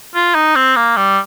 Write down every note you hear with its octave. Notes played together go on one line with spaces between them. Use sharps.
F4
D#4
C4
A#3
G3